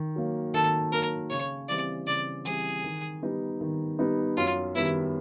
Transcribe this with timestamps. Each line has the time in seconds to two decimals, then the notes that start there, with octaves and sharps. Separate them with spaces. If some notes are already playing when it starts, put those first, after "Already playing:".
Already playing: D#3
0.16 F#3 A#3
0.54 D#3 A4
0.92 F#3 A#3 A#4
1.30 C#3 C#5
1.69 E3 G3 C4 D5
2.07 C#3 D5
2.45 E3 G3 C4 G#4
2.84 D#3
3.22 G3 B3 D#4
3.61 D#3
3.99 G3 B3 D#4
4.37 F#2 F4
4.75 D#3 G3 B3 E4